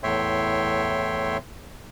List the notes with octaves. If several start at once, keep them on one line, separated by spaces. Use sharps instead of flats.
E2 A2 C#5 E5 G5 C6